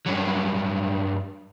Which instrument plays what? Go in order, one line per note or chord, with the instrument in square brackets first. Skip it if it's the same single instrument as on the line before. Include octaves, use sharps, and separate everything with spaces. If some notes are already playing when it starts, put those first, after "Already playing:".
[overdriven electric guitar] G2 F#3